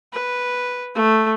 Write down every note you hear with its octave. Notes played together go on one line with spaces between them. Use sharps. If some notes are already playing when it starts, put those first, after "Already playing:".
B4
A3